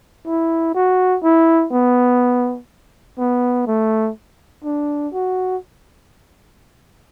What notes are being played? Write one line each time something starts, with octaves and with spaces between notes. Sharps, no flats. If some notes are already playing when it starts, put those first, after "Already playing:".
E4
F#4
E4
B3
B3
A3
D4
F#4